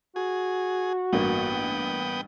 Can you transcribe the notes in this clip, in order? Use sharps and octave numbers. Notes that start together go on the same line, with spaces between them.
F#4 G#4
A1 G2 A#3 B3 G5 D#6